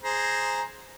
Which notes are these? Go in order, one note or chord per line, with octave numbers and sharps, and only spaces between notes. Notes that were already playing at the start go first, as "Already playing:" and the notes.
G#4 C5 A#5